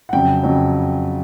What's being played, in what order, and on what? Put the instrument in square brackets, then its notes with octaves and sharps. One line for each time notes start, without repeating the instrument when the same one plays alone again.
[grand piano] F#5
F2 C#3 F#3 G5
F2 C#3 F#3